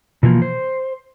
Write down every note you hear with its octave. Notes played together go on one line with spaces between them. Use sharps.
B2 E3 F3 A#3
C5